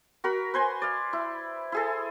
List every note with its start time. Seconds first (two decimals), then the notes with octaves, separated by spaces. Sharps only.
0.24 F#4 A#4 B5
0.54 B4 C5 G#5 C6
0.82 D5 F5
1.13 E4
1.72 E4 G#4 A4